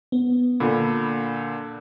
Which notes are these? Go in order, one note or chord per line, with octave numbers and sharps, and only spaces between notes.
B3
A#2 D3 B5